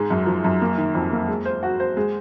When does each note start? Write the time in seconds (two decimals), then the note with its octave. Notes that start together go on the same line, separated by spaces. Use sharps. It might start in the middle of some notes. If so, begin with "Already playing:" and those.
Already playing: G#2 G#3
0.10 F#2
0.27 F3
0.44 F#2
0.61 A#3
0.78 D#3
0.95 F2
1.12 A#3
1.28 G#3
1.45 C5
1.63 F#4
1.80 C5
1.97 G#3